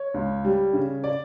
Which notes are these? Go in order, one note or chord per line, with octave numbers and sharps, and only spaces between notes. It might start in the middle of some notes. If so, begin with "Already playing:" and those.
Already playing: C#5
C#2
G3
C#3
D5